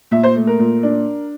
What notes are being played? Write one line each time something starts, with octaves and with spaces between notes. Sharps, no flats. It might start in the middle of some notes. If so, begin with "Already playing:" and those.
A#2 E5
C5
A3
A#4
A#2
D4